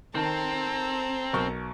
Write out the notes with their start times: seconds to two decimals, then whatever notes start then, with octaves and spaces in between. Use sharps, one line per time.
0.15 D#3 C4 A4 A5 A#5
1.33 B1 A#4 C#6